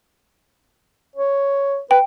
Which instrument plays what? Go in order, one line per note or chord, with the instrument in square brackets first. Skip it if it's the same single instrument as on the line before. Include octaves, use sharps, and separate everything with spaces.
[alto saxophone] C#5
[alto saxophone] B4 [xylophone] G5